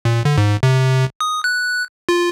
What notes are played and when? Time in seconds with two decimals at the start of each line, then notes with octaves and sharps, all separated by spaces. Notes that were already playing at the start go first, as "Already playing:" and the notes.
0.05 A#2
0.25 D3
0.38 G#2
0.63 C3
1.20 D#6
1.44 F#6
2.09 F4